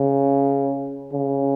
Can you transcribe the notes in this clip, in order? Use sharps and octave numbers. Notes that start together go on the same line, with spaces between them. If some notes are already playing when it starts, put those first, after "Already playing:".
Already playing: C#3
C#3